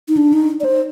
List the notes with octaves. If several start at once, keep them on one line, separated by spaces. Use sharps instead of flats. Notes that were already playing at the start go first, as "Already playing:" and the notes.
D#4
D4
D#4
D5
C5